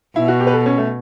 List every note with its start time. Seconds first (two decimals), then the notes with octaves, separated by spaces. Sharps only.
0.16 B2 E4
0.28 F#4
0.40 G4
0.47 B4
0.53 A4
0.66 C#4
0.78 A3